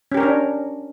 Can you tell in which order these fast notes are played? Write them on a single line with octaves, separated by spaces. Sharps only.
C#4 G4 A#4 C#5 D4